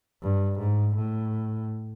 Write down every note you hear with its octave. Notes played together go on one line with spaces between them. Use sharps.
G2
G#2
A2